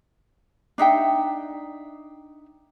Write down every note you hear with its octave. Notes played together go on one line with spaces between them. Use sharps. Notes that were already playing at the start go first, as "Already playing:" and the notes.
D4 D#4 E5 G5